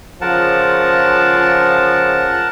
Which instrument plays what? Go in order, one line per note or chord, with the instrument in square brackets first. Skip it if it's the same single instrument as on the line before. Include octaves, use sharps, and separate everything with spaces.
[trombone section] C#3 F3 [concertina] A#4 F#5 A5